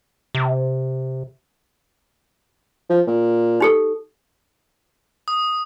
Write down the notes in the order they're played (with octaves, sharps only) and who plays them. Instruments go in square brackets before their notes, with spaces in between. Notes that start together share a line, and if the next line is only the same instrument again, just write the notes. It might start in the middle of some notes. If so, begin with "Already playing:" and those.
[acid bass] C3
[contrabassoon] F3
A#2
[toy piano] D#4 G4 A4
[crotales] D#6